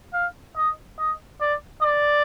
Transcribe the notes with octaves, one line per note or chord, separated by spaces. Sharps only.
F5
D#5
D#5
D5
D5